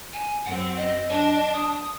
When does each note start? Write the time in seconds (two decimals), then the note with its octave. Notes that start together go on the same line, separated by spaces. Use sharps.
0.13 G#5
0.45 F#2 C4 F#5
0.77 D#5
1.09 D4
1.53 D#6